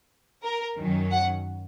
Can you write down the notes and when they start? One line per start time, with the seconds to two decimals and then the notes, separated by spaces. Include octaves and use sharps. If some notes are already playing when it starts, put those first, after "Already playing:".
0.44 A#4
0.77 F#2 D#3 F#3 C#4
1.11 F#5